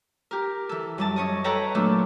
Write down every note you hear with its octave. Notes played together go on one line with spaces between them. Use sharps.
G4 A#4
E3 A4
F#2 G3 A5
C#4 C#5 D#5
A4 B4 C#5 G5 A5 A#5
A#2 F#3 A3 B3 D4 A4